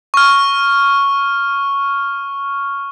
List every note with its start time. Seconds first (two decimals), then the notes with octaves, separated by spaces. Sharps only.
0.14 C#6 F6